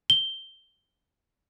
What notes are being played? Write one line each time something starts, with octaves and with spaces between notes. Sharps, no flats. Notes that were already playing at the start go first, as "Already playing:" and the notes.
G7